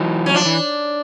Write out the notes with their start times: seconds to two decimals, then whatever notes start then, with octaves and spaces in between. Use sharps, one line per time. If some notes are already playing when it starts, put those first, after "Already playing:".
Already playing: E3 F#3 D#4
0.26 C#4
0.34 F3 D4
0.45 E3